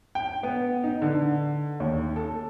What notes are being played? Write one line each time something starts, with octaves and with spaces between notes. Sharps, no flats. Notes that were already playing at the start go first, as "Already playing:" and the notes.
G5
B3
D#4
D3
D#2
A4